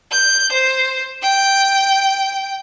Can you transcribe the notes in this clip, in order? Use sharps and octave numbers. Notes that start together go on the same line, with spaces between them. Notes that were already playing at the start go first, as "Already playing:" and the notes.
G6
C5
G5